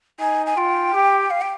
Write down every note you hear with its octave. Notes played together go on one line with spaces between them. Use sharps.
D#4 G#5
G#5
F4 G5
G4
F5
G5